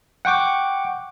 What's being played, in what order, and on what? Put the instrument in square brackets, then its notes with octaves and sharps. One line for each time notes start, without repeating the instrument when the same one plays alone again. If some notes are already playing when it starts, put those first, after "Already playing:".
[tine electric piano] F#5 G5 C#6 D6